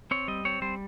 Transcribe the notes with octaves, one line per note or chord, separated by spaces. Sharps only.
C4 C#5
G3 D#5
C4 C#5
G3 C5